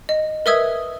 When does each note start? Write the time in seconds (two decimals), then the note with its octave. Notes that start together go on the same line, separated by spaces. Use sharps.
0.09 D#5
0.46 A#4 B4 E5 D#6 E6 G#6